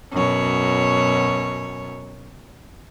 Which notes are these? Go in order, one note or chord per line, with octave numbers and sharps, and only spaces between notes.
F#2 B2 C#5